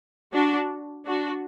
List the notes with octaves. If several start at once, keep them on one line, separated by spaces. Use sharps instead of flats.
D4 F#4
D4 F#4